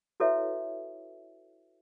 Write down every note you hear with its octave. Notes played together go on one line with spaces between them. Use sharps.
E4 F#4 A4 B4 C#5 E5